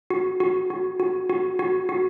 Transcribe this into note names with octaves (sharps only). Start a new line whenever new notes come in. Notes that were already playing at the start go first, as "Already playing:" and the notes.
F#4
F#4
F#4
F#4
F#4
F#4
F#4